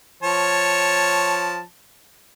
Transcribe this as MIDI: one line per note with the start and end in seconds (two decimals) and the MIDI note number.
0.23 1.61 53
0.23 1.61 73
0.23 1.61 81